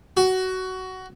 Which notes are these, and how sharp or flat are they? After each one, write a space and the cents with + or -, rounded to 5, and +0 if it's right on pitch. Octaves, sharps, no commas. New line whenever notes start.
F#4 +15